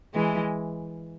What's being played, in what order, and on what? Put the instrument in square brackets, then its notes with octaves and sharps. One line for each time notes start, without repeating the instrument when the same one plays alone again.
[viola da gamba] E3 G#3